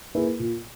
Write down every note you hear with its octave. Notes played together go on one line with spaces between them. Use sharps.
A#3 E4 G#4 B4
A#2